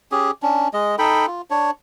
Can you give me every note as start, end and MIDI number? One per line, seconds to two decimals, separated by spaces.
0.12 0.31 61
0.12 0.31 67
0.12 0.31 68
0.42 0.68 61
0.42 0.68 62
0.73 0.96 56
0.73 0.96 75
0.99 1.26 63
0.99 1.26 69
0.99 1.26 79
0.99 1.26 83
1.27 1.42 65
1.50 1.71 62
1.50 1.71 73